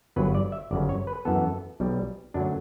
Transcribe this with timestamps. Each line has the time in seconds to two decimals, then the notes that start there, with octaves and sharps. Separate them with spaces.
0.16 G1 G2 F#3 B3 B4
0.35 D5
0.52 E5
0.71 G1 F#2 C#3 D5
0.89 C#5
1.07 B4
1.25 F#2 E3 B3 A4
1.80 B1 B2 G3
2.34 F#2 D3 F#3 A3 D4